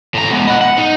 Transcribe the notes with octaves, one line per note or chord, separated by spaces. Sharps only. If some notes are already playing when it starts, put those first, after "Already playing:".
A2 A#5
G#3 B3
D#5 F#5
F#5
D#4